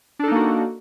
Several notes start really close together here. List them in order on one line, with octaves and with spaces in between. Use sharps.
D4 A4 D#4 A#3 F#4